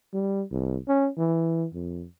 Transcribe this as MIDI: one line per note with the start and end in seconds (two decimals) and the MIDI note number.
0.13 0.42 55
0.52 0.78 36
0.88 1.09 61
1.18 1.66 52
1.74 2.05 41